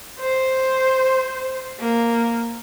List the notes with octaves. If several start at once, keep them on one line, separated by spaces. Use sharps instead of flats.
C5
A#3